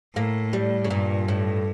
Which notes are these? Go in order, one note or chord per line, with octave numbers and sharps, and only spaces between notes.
A2 A#3
G3
C#3
G2 A#2
A2